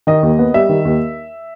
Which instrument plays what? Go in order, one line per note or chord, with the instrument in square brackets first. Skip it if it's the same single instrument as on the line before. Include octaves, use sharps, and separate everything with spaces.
[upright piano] D#3 D#5
D#2
B3
G3 E5
D#3
D#2